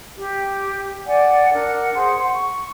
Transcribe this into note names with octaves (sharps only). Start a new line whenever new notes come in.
G4
D5 F#5 G#5
D4 A#4 F#5
G#4 C5 F#5 C6
F#5 C6
C#6